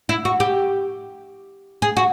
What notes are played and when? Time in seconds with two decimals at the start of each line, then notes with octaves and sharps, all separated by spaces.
0.09 E4
0.25 F#4
0.40 G4
1.82 G#4
1.97 F#4